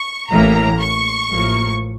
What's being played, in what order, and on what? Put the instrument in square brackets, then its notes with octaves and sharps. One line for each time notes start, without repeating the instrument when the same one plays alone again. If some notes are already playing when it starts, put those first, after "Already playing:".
Already playing: [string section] C#6
A1 A2 E3 A#3 A#5
C#6
A1 A2 F3 A#3